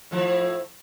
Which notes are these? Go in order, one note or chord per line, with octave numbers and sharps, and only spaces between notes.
A2 F3 E4